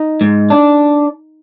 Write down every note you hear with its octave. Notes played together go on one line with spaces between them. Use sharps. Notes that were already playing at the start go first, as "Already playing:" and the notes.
Already playing: D#4
G#2
D4